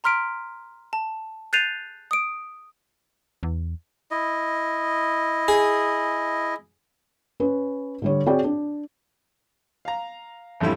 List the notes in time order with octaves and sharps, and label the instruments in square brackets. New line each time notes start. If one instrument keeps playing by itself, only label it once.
[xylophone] A#5 C6 F6 B6 D7
A5
F#6 G6 A6 C7 D#7 F7
D#6 D7
[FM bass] E2
[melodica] E4 D#5
[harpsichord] G#4
[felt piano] C#4 B4
D3 G3 C#5
C4 F#4 G#4 C#5 D5 G5
D4
[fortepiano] F5 A#5
A1 F2 D3 G3 E4